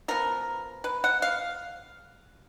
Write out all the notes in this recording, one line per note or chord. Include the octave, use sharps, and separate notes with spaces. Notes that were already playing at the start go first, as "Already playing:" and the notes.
F3 B3 A#4
B4
F#5
F5